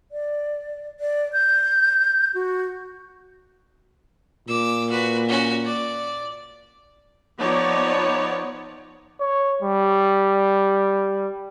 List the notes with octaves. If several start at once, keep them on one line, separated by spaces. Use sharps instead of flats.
D5
D5
G6
F#4
A#2 D6 E6
F#4 B4
C#4 F#4
D5
F3 B3 D#4 C#5 D5
C#5
G3